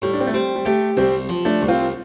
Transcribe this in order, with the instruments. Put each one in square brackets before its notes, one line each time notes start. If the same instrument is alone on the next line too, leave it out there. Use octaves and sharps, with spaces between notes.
[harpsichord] A2 [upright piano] G3
[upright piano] D4
C4
A3
[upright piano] G3 [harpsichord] C4
[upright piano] G3
[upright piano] A3 [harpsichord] G4
[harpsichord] C2 [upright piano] G3 C4
[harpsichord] F3
[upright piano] A3 D4
[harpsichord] C2
[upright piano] C4 F4